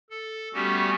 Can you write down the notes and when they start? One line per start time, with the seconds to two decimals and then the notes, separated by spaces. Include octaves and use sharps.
0.10 A4
0.54 G3 A3 B3 C#4 F#4 G4